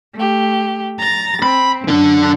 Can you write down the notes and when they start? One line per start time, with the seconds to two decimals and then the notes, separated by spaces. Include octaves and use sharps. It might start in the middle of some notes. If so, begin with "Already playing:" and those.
0.14 A3 G4
0.99 A#5 A6 A#6
1.42 C4 B5
1.88 F#2 D3 D4